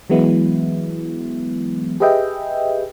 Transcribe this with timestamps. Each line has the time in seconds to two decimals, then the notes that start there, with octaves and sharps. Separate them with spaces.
0.10 E3 F#3 G#3 B3 E4
2.00 G4 G#4 B4 D#5 E5 G5